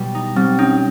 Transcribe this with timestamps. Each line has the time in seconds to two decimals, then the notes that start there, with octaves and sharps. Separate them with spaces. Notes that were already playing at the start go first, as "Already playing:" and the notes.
Already playing: B2 G3
0.15 D#4
0.36 G3 C4
0.59 C#4 D#4